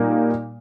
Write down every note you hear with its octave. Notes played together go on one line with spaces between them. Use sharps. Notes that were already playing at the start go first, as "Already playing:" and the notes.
Already playing: A#2 G3 A#3 D#4